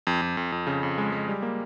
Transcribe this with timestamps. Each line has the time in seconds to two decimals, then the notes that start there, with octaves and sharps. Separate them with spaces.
0.07 F2
0.22 F2
0.37 F2
0.52 F2
0.67 C#3
0.83 F2
0.98 G#3
1.12 G#3
1.28 G3
1.42 A#3